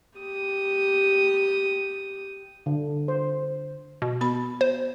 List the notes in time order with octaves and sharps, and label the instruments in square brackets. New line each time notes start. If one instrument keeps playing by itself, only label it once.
[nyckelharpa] G4 D#6
[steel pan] D3
C5
[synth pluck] B2
[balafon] B3 F#4 B5
[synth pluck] C5